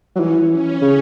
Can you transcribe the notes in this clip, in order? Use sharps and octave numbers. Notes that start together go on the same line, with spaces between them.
F#3
E3 C#4
C#4
C#3